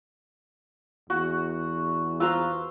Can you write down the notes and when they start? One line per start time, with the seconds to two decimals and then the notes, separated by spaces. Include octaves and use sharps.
1.10 E2 F#4
2.20 F4 B4 C5 A#5 E6